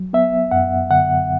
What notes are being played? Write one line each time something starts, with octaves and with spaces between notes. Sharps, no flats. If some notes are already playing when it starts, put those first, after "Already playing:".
Already playing: F#3
B3 E5
F#2 F#5
D3 F#5